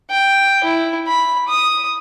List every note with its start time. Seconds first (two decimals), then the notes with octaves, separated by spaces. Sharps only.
0.10 G5
0.64 E4
1.07 B5
1.48 D#6